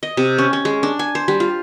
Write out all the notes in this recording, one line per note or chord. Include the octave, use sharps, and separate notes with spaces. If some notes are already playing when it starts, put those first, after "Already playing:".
D#5
C3
C#4
C#4
G#3
D4
G#5
C5
G3
F4